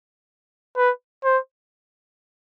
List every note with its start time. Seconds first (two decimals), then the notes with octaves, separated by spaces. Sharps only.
0.77 B4
1.24 C5